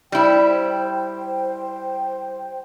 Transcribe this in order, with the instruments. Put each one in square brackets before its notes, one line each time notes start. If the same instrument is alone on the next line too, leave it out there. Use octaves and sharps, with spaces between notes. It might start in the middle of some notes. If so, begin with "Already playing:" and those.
[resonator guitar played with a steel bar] G3 E4 [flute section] C5 G5